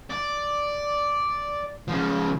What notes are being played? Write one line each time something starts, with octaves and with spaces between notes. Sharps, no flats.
D5
C#3 F3